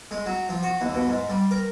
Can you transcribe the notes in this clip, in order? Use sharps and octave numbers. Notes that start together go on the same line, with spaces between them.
G#3
F#3
F3
F#4
D#2
B2
G#2
G3
A#4